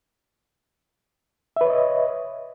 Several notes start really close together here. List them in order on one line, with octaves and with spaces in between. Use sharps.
E5 B4 C#5 D#5